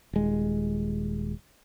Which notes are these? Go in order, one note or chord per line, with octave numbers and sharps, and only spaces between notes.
D#1 G#3